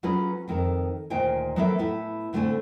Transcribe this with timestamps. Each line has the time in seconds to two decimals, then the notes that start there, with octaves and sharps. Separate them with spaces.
0.03 F#3 C#4 F4 G#4 B4
0.48 F2 D#3 A4 A#4
1.10 D2 A#2 D#3 C5 G5 G#5
1.56 F#3 A#3 B3 A4 A#4 E5
1.79 A2 B3 E4 A5
2.33 A2 D3 A3 C4 A4 G#5